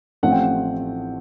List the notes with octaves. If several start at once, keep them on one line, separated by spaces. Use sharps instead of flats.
A1 A2 F3 A3 C4 F#5
G5
F#5